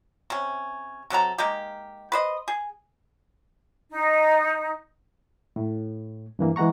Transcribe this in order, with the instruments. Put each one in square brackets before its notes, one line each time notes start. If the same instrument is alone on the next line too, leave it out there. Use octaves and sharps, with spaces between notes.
[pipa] C3 C#4
C3 F#3 A4 A#5
G#3 A#3 D#4 G4
B4 C5 D#5
G#4
[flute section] D#4
[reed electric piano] A2
G2 E3 A#3
E3 G#3 F#5 A#5 C#6